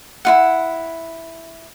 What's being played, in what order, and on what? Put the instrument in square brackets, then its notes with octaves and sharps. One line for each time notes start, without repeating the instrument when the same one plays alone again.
[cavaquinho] E4 F4 F#5